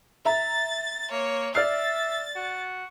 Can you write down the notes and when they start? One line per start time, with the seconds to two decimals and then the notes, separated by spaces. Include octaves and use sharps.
0.25 E5 A#5 A6
1.11 A#3 C#5
1.55 D5 E5 F6 A6 C7
2.36 F#4